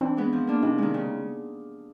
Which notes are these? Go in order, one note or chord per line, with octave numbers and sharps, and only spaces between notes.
E3 C4 D4
G#3 B3
F3
A#3 D4 F4
C3 C#4 D#4
D#3 G#3
C#3